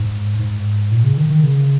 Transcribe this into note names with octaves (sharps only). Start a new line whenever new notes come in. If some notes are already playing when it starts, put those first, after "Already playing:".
Already playing: G#2
G#2
A#2
C#3
D#3
D#3
C#3